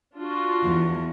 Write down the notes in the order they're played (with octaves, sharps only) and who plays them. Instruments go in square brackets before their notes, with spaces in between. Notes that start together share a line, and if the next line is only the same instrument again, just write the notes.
[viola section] D4 F4 F#4
[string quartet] E2